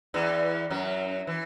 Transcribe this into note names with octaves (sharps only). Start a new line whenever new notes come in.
E2 E3
F#2 F#3
E3